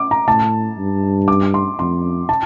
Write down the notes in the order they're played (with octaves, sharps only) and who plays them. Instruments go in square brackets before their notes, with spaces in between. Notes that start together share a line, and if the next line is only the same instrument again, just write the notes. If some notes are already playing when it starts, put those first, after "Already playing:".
Already playing: [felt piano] D6
A#5
[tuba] A2 [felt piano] A5
[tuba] G2
[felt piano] D6
C6
[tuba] F2 [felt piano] C6
[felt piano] A5